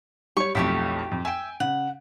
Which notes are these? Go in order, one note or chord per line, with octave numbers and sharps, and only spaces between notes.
G3 C#5 C#6
B1 F2 A3 E4 G4 C#6
F2
E5 G5 G#5
C#3 F#5